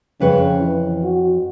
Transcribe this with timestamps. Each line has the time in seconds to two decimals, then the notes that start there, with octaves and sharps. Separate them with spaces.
0.20 F2 C#3 B4 C#5
0.60 E3
1.03 F#4